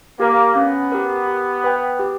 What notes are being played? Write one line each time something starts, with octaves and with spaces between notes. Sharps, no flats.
A#3 G4 A#4
B3 C#4
G4 A#4
G4
B4 G5
G4